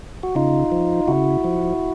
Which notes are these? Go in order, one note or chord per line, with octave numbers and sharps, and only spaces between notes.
F#4
C#3 D#4 F4
F3
C#3 E4 F#4
F3